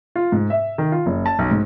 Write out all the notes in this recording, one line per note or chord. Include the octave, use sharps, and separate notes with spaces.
F4
G#2
E5
D#3
F4
F#1
A5
B1
G#2